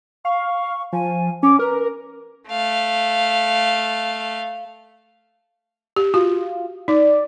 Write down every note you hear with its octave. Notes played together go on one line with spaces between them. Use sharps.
F5 C#6
F3 G#5
C#4 D6
A#4 B4
A3 F5
G4
F4 F#4
D#4 D5